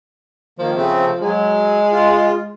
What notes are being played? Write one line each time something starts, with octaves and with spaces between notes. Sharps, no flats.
D#3 F3 A#3
C#3 A3 C4
F#3 G#3
F4